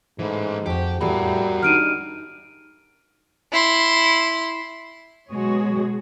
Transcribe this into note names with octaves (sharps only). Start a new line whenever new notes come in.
G#2 E3 A3
F2 F#4 G4
E2 A2 G3 F#4 G#4 A#4 B5
G3 D4 D#4 F6 D7 D#7
E4 C6
B2 F#3 G#3 F#4 G#4 C#5